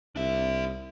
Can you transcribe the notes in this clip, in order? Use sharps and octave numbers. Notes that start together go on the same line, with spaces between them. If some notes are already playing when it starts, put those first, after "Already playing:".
C2 D4 E5